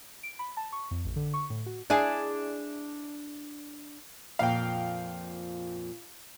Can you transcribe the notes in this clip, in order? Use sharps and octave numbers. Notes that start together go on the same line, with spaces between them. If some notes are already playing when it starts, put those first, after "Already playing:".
D7
B5
A5
C#6
F2
A1
D3
C#6
A2
F#4
D4 E4 G#4
F2 A#2 F3 F5 G5